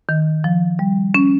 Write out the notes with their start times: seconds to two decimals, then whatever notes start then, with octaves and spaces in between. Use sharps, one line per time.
0.09 D#3
0.44 F3
0.79 G3
1.14 C#4